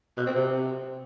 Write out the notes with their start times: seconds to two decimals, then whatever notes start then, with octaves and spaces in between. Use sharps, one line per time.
0.17 B2
0.26 C4
0.35 C3